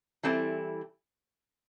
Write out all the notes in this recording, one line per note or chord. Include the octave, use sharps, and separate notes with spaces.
E3 G3 C4 E4 A4